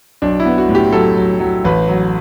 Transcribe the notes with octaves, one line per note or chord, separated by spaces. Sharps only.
B1 D4
E4
B3
F#4
A2
G4
F#3 A4
F#3
F#3
A1 B4
F#3